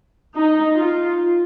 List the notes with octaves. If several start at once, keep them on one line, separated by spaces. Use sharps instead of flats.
D#4
F4